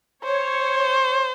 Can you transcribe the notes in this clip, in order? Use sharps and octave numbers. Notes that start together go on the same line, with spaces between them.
C5 C#5